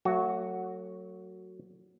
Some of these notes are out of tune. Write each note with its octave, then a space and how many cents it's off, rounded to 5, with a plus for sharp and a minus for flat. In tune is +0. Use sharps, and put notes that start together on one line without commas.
F#3 +0 A3 +35 F#4 +0